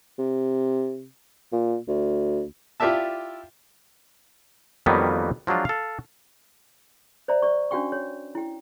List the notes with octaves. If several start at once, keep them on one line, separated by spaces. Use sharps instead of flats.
C3
A#2
D2
E4 F4 G4 D5 E5 A5
F2 D#3 F#3 G3 A#3 B3
F3 F#3 G#3 D4 F4
A4 F5
C5 D5 E5 A#5
D5 C#6
C#4 D4 F#4 F5 G5 C#6
C#5
E4 G5